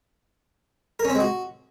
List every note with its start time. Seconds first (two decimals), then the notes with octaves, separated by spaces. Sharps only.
0.99 A#4
1.05 C#4
1.10 C4
1.15 G#3
1.20 F#4